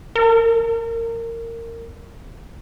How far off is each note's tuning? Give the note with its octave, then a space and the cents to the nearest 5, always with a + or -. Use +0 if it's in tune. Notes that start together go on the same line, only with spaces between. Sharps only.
A#4 -20